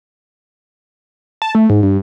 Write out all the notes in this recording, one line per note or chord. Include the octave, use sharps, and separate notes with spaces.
A5
A3
G#2
G2